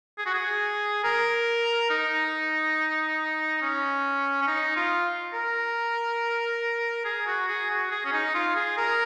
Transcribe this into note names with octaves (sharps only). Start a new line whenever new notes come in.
G#4
F#4
G#4
A#4
D#4
C#4
C#4
D#4
F4
A#4
G#4
F#4
G#4
F#4
G#4
C#4
D#4
F4
G#4
A#4